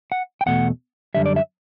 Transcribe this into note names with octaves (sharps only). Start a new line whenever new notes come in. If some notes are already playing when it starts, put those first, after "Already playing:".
F#5
G5
E2 B2 A3 F#5
F#2 D3 G3 E5
D5
E5